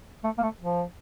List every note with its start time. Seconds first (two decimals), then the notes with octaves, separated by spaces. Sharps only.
0.24 A3
0.38 A#3
0.42 A3
0.61 F3